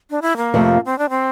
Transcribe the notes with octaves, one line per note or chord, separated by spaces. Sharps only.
D4
E4
A#3
F2 C3 F3 A3
C4
D4
C4